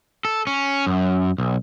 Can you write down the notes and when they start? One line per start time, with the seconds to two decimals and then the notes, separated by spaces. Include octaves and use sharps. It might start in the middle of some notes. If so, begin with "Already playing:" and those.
0.25 A4
0.47 C#4
0.86 F#2
1.38 B1